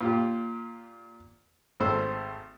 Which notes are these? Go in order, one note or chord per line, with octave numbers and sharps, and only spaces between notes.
A#2 F4 G4
G#1 A3 C5 E6